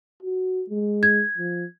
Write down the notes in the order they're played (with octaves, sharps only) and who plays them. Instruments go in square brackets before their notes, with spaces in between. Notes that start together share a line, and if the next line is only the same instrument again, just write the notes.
[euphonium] F#4
G#3
[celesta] G#6
[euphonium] F3